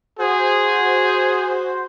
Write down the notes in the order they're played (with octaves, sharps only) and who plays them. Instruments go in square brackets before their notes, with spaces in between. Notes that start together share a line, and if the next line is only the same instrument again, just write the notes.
[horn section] F#4 C5 [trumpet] G#4